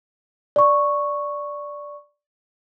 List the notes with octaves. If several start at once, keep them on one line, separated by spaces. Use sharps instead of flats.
D5 C#6